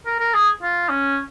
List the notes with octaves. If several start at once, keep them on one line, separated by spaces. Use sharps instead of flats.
A#4
A#4
G#4
F4
C#4